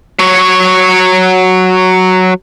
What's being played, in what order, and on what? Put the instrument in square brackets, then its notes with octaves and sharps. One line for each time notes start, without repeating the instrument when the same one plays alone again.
[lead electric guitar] F#3 C#5